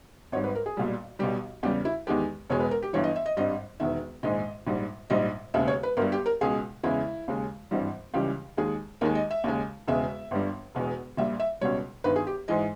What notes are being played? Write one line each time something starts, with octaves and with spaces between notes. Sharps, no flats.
G#1 G#2 G3 C#5
B4
A#4
G#4
B1 A#2 G3
B1 B2 G3 G4
E2 C#3 G3 G4
E4
E2 D#3 G#3 G4
E1 E2 B2 G#3 C#5
B4
A#4
G4
G1 G2 E3 C#5
D#5
E5
D#5
G#1 G2 G3 D#5
E1 E2 D#3 E5
A#1 G#2 D#3 G#3 D#5
A#1 G#2 G3
A#1 G#2 G3 D#5
E1 D#2 C#3 G#3 E5
C#5
B4
G1 G2 G3 A#4
G4
A#4
C#2 B2 G#3 G#4
E2 C#3 G#3 E4
D#2 C#3 G#3
G#1 G2 E3 G3
C#2 C#3 E3 G3 G4
D#2 D#3 G#3 G#4
D#2 D#3 G#3 A#4
D#5
E5
D#2 C#3 G#3
E1 E2 C#3 G#3 E5
G1 G2 G3
E1 E2 B2 G#3
A#1 A#2 G3 E5
E5
C#2 B2 G3 C#5
G1 G2 D#3 B4
G#4
G4
G#2 E3 G#3 D#5